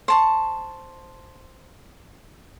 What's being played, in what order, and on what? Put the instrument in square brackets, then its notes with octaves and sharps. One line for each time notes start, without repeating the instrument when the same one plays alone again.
[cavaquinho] C5 A5 C#6